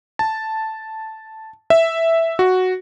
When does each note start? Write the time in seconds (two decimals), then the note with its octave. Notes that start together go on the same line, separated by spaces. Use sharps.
0.19 A5
1.70 E5
2.39 F#4